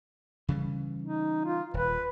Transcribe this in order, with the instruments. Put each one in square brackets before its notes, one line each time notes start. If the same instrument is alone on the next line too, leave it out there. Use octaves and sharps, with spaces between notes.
[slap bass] C#3 E3 G3
[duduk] D#4
F4
[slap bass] D#1 [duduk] B4